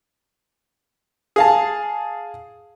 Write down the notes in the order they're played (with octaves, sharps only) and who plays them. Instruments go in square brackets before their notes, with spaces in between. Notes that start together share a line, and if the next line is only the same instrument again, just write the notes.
[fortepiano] G#4 F5 A5